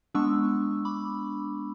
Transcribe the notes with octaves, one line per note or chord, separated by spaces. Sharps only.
G#3 B3 D4 C#6 E6
B5 D6